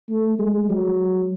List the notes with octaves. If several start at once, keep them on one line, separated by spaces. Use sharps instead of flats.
A3
G#3
F#3